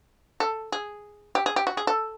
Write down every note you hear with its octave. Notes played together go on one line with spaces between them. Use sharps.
A4
G#4
G4
G#4
G4
F#4
G#4
A4